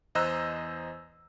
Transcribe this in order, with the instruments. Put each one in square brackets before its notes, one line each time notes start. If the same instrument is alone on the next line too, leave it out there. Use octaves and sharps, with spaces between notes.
[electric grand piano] E2 C5 D#5 A#5 E6 F#6